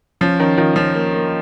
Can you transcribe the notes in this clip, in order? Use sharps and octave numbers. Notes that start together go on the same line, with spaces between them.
F3 C#4
D#3 C#4
D#3 F4
F3 C#4
A#3
A#3